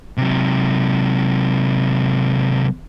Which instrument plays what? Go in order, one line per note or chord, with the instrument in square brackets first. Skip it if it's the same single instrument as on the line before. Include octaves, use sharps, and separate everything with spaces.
[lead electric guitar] C3 F#3